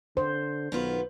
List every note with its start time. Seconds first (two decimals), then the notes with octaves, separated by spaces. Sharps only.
0.17 D3 C5
0.72 B1 D#3 B3 F4